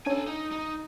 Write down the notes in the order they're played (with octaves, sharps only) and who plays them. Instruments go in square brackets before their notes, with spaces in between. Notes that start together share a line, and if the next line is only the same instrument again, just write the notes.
[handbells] C#4 D4 C#5 [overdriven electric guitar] A4 G#5
[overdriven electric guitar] D#4
D#4